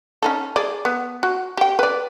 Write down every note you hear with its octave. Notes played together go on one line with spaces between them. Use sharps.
C#4 D#4 A4
G#4 D5
B3
F#4
G4 G5
B4 D5